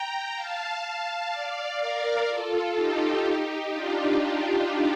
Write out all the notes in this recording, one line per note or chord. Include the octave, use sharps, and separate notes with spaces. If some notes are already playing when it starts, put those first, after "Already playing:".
Already playing: G5 A#5
F5 A5
F5 A5
D5 F5
A#4 D5
F4 A4
D#4 G4
D#4 G4
D4 F4